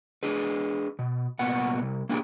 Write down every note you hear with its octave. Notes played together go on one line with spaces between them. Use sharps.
D4 G#4 B4
B2
C2 A#2 B3 F#5
C2
A#3 D4 E4 G4 G#4